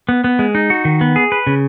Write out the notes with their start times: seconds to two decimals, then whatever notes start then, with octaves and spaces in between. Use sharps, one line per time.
0.09 B3
0.24 B3
0.39 G#3
0.55 D#4
0.70 F#4
0.85 D#3
1.01 B3
1.16 G#4
1.32 B4
1.47 C#3